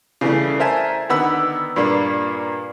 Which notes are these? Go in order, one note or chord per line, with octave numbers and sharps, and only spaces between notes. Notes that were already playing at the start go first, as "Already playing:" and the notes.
C#3 E3 G3 A3
A#4 C5 E5 G#5 A5
D3 D#3 B3 B5 E6
G2 A#2 G3 A#3